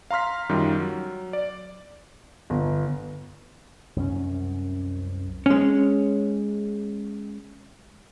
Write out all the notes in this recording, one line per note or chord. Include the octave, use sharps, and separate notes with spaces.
F5 A#5 C6 F6 B6
F#2 D#3 G3 F4
F#3
D5
G1
C2 F#2 C4 C#4
G#3 C#4